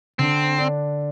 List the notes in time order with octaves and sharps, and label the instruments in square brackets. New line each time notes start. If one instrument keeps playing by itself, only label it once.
[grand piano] D3 [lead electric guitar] C4
[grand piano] D4